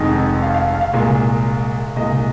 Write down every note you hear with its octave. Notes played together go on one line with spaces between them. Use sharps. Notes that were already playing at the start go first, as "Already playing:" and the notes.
Already playing: F1 F2 D#3 G#3 D#4
F5
F5
F5
F5
C2 A#2 G#3
C2 A#2 G#3 D#5